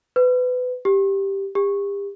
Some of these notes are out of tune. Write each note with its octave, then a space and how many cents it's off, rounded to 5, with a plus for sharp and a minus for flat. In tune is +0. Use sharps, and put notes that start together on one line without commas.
B4 +25
G4 +0
G4 +35